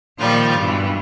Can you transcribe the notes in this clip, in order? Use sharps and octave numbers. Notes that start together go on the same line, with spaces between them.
A#2 D#3 F3 G3 F4
G2 B2 E3